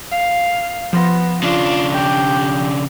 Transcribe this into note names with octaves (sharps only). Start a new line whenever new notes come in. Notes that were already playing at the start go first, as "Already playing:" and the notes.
F5
F3 B3 C6 A#6
C#3 D4 F4
G4